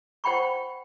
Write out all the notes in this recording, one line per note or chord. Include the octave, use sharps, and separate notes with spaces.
C5 F#5 G5 B5 C#6